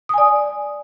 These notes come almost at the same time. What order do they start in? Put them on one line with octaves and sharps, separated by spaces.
D#6 G#5 D5